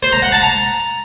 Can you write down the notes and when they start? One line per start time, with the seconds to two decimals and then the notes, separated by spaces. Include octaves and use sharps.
0.03 C5
0.12 A#5
0.22 F#5
0.32 A5
0.42 A#5